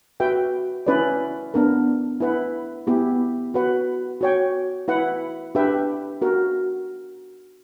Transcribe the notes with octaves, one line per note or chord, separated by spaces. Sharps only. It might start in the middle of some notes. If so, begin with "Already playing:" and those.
F#4 B4 E5 G5
C#4 E4 B4 D5
B3 D4 A#4
E4 B4 F#5
B3 E4 G4
F#4 B4 F#5
F#4 C#5 G5
E4 B4 F#5
D4 G4 B4 E5 G5
F#4 A#4